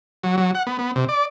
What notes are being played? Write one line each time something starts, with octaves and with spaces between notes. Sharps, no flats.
F#3
F#3
F#5
B3
B3
C3
D5